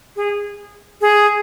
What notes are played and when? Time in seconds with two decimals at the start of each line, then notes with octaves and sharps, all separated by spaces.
0.16 G#4
1.01 G#4